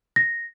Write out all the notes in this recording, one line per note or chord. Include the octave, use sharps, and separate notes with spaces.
A#6